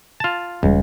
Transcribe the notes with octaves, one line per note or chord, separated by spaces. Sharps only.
F4 A5
E1 C#2 G3